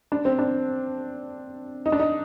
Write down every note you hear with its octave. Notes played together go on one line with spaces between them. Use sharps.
D4
C4
D4
D#4
D4
D#4